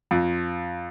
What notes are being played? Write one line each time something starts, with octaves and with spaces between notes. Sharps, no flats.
F2